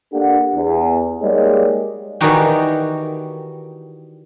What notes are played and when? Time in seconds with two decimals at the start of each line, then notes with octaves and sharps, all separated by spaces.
0.13 A#3 D4 G4 A4 F#5
0.55 E2
1.22 G3 G#3 A#3 D#4 C#5 D5
2.21 D#3 E3 G3 D#4 F#4 G4